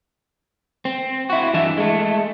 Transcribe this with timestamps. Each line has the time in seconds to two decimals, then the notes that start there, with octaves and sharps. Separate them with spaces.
0.85 C4
1.30 E4 F#4
1.54 G2 E3 D4 E4 E5
1.78 G#3 A3